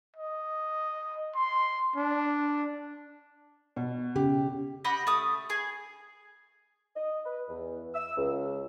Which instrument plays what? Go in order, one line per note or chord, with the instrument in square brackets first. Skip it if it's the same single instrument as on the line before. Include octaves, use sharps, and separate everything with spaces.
[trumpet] D#5
C6
D4
[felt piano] B2
[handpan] C#3 [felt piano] G4
[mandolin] G4 D#5 F#5 B5
A3 D#6
G#4
[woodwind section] D#5
B4
E2
E6
C#2